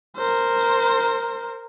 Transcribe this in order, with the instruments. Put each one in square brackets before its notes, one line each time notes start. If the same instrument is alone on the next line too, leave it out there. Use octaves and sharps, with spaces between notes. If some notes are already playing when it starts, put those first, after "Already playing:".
[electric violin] A#4 C5